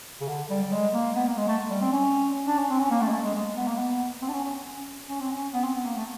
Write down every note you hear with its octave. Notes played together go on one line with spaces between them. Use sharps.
C#3
D3
G3
G3
G#3
A#3
B3
A#3
G#3
A3
G3
C4
C#4
D4
C#4
C4
C#4
A#3
A3
G#3
A3
G#3
G#3
B3
A#3
B3
C4
D4
C#4
C#4
C#4
C4
C#4
B3
C4
B3
A#3
A3